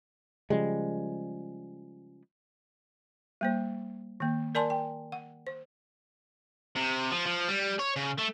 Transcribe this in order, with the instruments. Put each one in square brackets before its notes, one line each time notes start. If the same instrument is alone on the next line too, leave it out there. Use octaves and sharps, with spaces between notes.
[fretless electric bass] C#3 F3 G3 G#3
[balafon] G3 A#3 C5
D#3 A#3
A#4 D5 G#5 A5 C6
G5
F#5
C5
[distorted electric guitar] C3
F3
F3
G3
C#5
C#3
A3